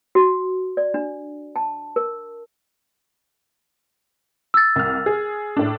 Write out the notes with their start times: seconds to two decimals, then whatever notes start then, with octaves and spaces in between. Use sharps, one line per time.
0.15 F#4
0.77 D5
0.94 D4
1.56 A5
1.96 A#4
4.54 E6 A6
4.76 C2 F6
5.06 G#4
5.57 A2 D4